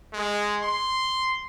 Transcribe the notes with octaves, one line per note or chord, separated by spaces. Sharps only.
G#3
C6